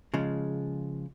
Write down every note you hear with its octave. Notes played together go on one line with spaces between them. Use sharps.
C#3 F3 G#3